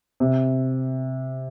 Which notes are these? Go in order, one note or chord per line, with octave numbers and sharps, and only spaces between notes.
C3